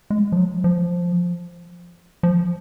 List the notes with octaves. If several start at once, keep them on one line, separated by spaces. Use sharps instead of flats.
G#3
F3
F#3
F3
F3